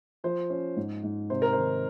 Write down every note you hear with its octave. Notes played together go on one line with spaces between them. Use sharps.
F3 C5
C#4
G#2
G#2
C3 C5
A#4
D#3 C5